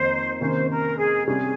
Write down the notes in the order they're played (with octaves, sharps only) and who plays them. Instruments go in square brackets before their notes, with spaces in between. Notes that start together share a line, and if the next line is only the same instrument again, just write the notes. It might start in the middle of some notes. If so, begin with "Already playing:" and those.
Already playing: [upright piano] F2 D#3 A#3 D#4 [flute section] C5
[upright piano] C3 D#3 A#3 C#4 [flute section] C5
[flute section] A#4
G#4
[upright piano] C3 G3 C#4 [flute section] G#4